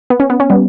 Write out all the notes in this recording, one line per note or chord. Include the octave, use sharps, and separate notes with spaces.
B3
C#4
B3
C#4
G3 B3